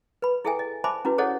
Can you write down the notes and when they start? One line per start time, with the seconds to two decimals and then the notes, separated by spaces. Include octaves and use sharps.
0.22 B4 B5
0.45 E4 G#4 A4 E5 G5 G#5
0.59 D#5
0.84 C5 E5 G#5 A5 B5 D6
1.05 C#4 E4 F#4 B4
1.18 G#4 A4 C5 C#5 D#5 F#5